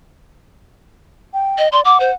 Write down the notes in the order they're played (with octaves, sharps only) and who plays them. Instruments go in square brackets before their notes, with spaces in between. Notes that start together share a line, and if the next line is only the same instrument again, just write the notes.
[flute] G5
[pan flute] D#5
[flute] D5 [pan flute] C6
[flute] F#5 [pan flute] D6
[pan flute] C5